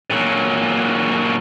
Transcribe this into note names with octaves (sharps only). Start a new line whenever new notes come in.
A#2 F#3